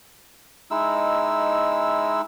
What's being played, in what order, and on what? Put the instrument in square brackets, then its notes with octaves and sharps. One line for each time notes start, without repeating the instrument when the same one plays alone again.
[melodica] G#3 D#4 E4 E6